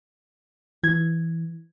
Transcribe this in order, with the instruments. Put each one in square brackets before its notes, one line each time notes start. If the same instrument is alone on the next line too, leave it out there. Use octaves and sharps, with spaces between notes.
[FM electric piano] E3 [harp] G#6